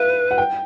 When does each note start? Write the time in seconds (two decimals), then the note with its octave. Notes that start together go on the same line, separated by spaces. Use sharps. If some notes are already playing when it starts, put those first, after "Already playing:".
Already playing: B4 E5 F5
0.31 F#5
0.38 G5